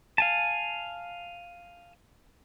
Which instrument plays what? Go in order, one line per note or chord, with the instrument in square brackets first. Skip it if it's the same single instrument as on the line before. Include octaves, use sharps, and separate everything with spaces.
[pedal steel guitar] F5 G#5 A5